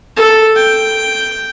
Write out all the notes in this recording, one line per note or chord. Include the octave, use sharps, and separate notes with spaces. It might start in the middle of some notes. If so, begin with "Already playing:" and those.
A4
G5